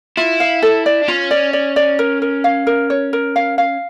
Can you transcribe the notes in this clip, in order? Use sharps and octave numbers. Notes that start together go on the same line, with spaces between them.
E4 F4
F5
A4
D5
D4
C#4 F4
D5
D5
D5
A#4
A#4
F5
A#4
C#5
A#4
F5
F5